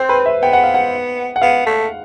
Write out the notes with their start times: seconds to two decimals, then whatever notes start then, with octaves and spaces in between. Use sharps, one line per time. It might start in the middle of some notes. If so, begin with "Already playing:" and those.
Already playing: C4 C5
0.09 B4
0.26 E5
0.42 B3 G5
0.53 F#5
0.64 F5
0.74 F#5
1.36 F#5
1.42 B3 F5
1.66 A3